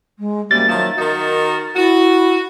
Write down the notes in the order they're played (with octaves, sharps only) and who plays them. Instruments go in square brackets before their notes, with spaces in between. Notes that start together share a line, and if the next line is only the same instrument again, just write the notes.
[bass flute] G#3
[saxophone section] F#2 C3 G3 [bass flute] A#3 [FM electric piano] A6
[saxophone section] D#3 F3 E5 [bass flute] F#3
[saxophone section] D#3 D#4 F#4 [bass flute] A#4
[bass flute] E4 [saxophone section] F#4